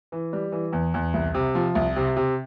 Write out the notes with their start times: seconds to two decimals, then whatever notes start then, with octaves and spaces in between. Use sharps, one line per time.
0.12 E3
0.33 G3
0.52 E3
0.73 E2
0.94 E2
1.14 C2
1.34 C3
1.55 F3
1.75 C2
1.96 C3
2.16 C3